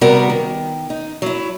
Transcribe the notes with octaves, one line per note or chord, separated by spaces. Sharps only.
C3 G3 B3 F#4 A#4
D#3
D#4
F#3 E4